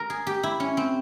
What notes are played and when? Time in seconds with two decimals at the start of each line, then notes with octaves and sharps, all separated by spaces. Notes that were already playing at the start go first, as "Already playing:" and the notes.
Already playing: A#4
0.10 G#4
0.27 G4
0.43 E4
0.60 C#4
0.77 C4